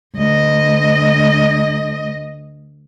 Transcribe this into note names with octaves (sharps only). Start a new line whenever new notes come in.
D2 D#5